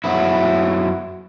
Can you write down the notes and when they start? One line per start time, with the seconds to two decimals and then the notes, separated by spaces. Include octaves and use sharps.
0.04 F#2 F#3 B3 E4